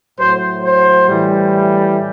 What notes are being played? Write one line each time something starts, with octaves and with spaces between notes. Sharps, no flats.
A2 F#3 C5
C5
A2 E3 G3